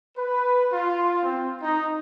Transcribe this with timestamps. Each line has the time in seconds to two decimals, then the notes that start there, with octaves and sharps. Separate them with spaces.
0.16 B4
0.71 F4
1.23 C4
1.61 D#4